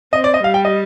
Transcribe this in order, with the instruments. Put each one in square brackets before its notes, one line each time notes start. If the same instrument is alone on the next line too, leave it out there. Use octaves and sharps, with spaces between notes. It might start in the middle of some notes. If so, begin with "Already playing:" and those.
[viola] C4 [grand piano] D#5
[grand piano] D5
D#5
[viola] G3 [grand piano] F5
[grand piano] G5
D#5